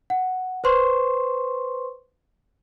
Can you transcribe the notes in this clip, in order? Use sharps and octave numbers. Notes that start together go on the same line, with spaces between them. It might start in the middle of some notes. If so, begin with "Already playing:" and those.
F#5
B4 C5 C6 C#6